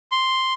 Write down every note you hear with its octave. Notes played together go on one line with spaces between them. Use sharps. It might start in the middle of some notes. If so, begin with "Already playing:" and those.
C6